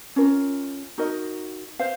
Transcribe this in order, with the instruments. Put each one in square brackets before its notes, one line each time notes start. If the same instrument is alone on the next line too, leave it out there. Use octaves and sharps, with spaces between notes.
[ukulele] C#4 F4 A#4
D#4 F#4 A#4 D#5
C5 F5